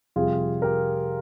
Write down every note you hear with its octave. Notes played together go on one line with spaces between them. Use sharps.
F2 C3 G3 F4 G#4
G4 A#4